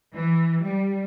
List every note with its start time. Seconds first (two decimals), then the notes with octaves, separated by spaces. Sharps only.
0.14 E3
0.65 G3